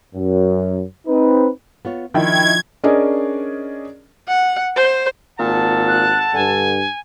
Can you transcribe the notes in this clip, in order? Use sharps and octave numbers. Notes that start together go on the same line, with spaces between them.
F#2
C4 D#4 B4
B3 F4 C#5
D#3 F3 D4 E4 G5 G#6
C#4 D4 G#4 A#4 D5 D#5
F#5
C5
G#1 A#2 A4 F#5 A5
F#6
G2 D3 G#5